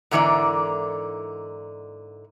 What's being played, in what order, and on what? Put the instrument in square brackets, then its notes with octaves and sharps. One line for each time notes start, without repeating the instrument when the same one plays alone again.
[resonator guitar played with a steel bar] G#2 D3 E3 A#3 D5